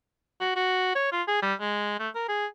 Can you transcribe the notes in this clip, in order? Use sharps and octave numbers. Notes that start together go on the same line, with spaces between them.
F#4
F#4
C#5
F4
G#4
G3
G#3
A3
A#4
G#4